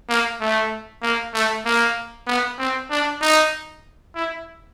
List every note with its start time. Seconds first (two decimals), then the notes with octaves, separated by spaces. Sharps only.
0.09 A#3
0.40 A3
1.02 A#3
1.34 A3
1.65 A#3
2.27 B3
2.59 C4
2.90 D4
3.22 D#4
4.15 E4